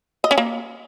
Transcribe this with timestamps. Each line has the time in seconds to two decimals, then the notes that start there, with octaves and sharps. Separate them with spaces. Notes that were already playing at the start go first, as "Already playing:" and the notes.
0.24 D#5
0.31 C#4
0.38 A#3